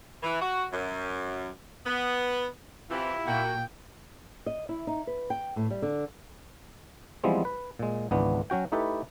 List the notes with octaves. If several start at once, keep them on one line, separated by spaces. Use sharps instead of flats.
E3
F#4
F#2
B3
C3 E3 E4 F4 G4
A#2 A#3 F#4 G5
D#5
E4
D#4
B4
G5
A2
G3
D3
E3 F3 G3 G#3 B3 C4
B4
A#2 G#3
G#1 C#2 C#3 E3 B3 D4
F#3 C#4 F#4 G5
A3 D#4 E4 G4 A4 B4